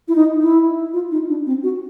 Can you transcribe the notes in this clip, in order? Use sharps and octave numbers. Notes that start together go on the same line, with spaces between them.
E4
D#4
E4
F4
D#4
D4
C4
F#4